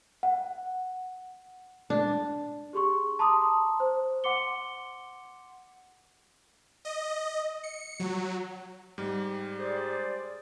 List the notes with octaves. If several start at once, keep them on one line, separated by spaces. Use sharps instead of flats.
F#5
D4
G4 G#4 C6 C#6
A5 A#5 C6 D6 D#6
C5
F#5 C6 D6 C#7 G7
D#5
C#7
F#3
G#2 G3
G#4 C5 D5